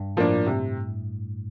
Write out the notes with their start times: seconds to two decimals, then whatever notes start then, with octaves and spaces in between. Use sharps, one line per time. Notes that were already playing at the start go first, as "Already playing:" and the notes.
Already playing: G2
0.17 A2 F3 A#3 D4
0.46 C3